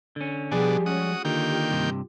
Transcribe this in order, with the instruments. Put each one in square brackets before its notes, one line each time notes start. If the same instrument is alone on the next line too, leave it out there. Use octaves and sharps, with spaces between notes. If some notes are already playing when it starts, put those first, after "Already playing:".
[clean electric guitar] D3 C#4
[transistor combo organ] B2 D4 [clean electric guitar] F3 G3 G#5 [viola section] G4 G#4
[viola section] G#3 C#4 [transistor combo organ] F#4 D#6
[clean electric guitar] D3 [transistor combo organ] D#3 A#3 G5 [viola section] F4 G4
[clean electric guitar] G2 C3